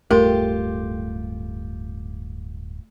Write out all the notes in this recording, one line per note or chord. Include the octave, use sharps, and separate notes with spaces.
D1 G2 A3 F4 G4 A#4